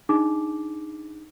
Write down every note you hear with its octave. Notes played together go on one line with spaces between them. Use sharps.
D4 D#4 G#4 D6